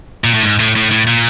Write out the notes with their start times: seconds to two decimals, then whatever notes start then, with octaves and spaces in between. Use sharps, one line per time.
0.24 A#2
0.34 A2
0.43 G#2
0.60 A2
0.76 A2
0.91 A2
1.07 A#2